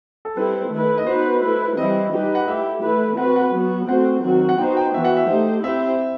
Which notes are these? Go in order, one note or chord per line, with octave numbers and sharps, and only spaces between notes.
A4
G3 C4 E4 A4 B4
D#3 A3 E4 B4
D#5
B3 D#4 F#4 B4 C5
A3 E4 B4
E3 G3 C4 E4 D#5
G3 D#4 G4 B4
F#5
A3 E4 G4 E5
E3 A3 E4 B4
C4 F#4 B4 F#5
F#5
F#3 B3 F#4
A3 C4 F#4 C5 F#5
D#3 F#3 C4 F#4
F#5
B3 D#4 F#4 C5 G5
G5
E3 B3 F#4 E5
F#5
E5
A3 D#4 G4 C5
C4 E4 G4 C5 E5